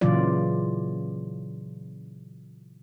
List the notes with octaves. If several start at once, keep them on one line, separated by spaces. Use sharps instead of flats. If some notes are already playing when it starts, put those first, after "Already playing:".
A#2 C#3 E3 F#3 F4 D5